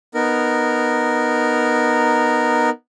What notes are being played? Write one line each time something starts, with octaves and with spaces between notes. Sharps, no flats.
B3 D#4 A#4